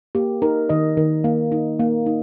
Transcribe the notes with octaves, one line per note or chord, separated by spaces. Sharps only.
A#3 G4
D#4 A#4
D#3 D#5
D#3
A#3
D#4
A#3
D#4